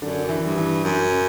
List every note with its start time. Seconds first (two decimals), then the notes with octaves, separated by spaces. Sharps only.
0.01 F#2 D3 D4
0.24 D4
0.29 E3 E4
0.42 G2
0.57 E3 E4
0.84 F#2
1.10 C#3 C#4